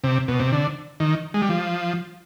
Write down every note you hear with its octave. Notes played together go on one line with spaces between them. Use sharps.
C3
B2
C3
D3
D#3
G#3
G3
F3